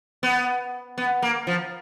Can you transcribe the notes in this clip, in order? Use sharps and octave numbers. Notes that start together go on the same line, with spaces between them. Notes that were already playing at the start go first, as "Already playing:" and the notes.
B3
B3
A#3
F3